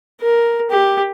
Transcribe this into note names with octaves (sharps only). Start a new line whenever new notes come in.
A#4
G4